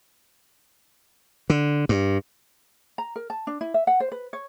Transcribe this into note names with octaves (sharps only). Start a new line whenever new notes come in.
D3
G2
A#5
A#4
A5
D4
E4
E5
F#5
C5
B4
C#5